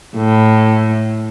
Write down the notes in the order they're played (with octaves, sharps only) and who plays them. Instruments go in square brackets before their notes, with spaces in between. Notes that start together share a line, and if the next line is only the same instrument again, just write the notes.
[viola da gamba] A2